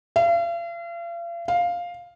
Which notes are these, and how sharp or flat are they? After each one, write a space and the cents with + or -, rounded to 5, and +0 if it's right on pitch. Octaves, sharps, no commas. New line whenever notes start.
F5 -40
F5 +5